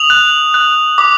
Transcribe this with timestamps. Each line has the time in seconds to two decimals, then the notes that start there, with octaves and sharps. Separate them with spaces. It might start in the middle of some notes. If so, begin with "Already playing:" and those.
Already playing: D#6 F7
0.10 F#6
0.54 F#6
0.98 D6